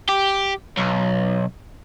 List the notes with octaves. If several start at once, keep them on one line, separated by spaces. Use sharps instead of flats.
G4
B1